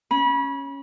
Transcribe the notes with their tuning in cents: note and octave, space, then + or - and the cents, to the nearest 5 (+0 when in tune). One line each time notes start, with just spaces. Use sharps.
C#4 +0 B5 -30